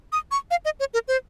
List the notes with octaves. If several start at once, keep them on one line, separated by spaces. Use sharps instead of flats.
D#6
C#6
F5
D#5
C#5
A#4
C5